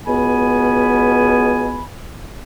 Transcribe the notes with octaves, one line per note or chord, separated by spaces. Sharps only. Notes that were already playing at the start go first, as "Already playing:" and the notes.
C#2 B2 B3 G#5 B5